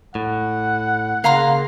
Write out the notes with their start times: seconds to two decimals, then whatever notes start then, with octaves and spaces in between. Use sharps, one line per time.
0.15 A2 F#5
1.24 C#3 A#3 F5 A#5 C6